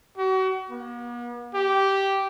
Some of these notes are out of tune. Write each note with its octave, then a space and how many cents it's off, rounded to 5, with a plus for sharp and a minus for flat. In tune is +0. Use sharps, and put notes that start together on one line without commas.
F#4 +35
B3 -45
G4 -10